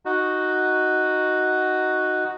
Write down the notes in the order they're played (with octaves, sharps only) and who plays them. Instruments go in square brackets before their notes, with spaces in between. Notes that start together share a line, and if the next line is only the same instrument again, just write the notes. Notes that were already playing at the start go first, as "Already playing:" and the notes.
[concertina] D#4 F#4